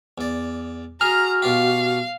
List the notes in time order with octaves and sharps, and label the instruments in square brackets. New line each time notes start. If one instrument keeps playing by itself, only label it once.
[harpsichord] E2 D5
[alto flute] F#4 [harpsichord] G#4 [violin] A#5 [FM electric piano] F6
[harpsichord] B2 F4 G4 [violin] F5